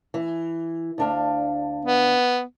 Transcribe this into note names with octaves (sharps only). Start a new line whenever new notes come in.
E3
D2 D4 F5
B3